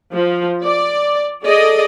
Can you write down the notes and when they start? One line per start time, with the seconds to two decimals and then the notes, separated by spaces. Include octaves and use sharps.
0.14 F3
0.65 D5
1.45 G#4 A4 D5 D#5